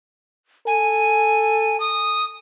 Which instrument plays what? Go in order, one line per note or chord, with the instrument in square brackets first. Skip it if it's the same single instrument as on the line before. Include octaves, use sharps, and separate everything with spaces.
[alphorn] A4 [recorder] G#5
[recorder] D#6